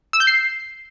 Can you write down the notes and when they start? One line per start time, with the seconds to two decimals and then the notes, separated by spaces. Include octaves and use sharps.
0.13 E6
0.20 G6
0.27 C7